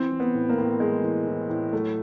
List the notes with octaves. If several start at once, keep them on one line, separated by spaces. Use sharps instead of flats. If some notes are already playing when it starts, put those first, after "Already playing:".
Already playing: E3 C4
E3
B3
A2
A#3
A2
E3 G#3
E3
A2
A2
F#3 A3